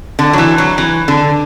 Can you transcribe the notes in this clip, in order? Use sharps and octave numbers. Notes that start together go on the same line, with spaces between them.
D3
F#3
E3
F#3
E3
D3